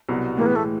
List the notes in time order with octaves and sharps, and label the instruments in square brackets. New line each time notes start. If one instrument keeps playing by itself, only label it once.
[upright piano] C2 B2 F#3
[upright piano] A2 E3 G#3 [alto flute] A#3
[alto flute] B3
A3